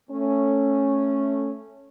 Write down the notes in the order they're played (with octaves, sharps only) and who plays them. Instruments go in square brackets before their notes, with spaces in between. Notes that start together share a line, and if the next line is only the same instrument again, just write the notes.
[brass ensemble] A3 C#4